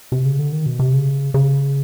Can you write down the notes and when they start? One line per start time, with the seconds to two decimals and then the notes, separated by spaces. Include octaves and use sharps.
0.12 C3
0.25 C#3
0.39 D3
0.52 D#3
0.66 B2
0.79 C3
0.94 C#3
1.34 C#3